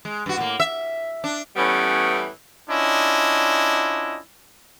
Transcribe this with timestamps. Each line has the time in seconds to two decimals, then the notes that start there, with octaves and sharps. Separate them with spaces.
0.05 G#3
0.26 G2 F#4
0.37 A2 A#3
0.60 E5
1.24 D4
1.57 A2 E3 G3 B3 C#4
2.69 C#4 D4 E4 F4 D#5